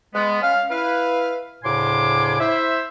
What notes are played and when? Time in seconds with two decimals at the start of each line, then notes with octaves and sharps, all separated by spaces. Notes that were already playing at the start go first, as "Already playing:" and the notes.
0.15 G#3 B3
0.42 C#4 F5
0.71 E4 B4 F5
1.64 D2 A2 C#3 G#5 C6 D6
2.40 E4 C5 E5